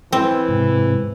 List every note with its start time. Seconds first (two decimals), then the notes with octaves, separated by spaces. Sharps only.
0.12 E3 C4
0.48 G#2 C3